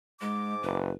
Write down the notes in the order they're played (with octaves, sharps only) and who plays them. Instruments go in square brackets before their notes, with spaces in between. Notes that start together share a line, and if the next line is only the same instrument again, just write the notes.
[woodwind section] G#2 D6 [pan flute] G#3
[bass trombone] F#1 [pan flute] B4